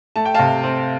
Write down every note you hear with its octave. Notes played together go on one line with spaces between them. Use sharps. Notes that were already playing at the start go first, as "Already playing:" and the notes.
A3 A5
G5
C3 F5 A5
C4